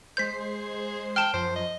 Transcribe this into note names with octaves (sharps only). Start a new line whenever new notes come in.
G#3 C5 G6 B6 C7
G#4
G5 A5 F6
F#2 F3 C5
D#5